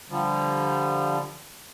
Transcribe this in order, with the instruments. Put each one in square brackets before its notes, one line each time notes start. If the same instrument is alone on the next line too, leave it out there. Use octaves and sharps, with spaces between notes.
[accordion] D3 F3 G3